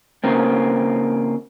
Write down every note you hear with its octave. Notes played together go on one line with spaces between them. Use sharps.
C#3 A#3 C4